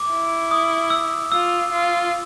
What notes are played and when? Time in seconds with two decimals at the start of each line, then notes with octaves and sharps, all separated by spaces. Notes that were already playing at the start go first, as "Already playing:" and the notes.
Already playing: D6
0.10 E4
0.51 D#6
0.90 E6
1.32 F4 E6
1.71 F4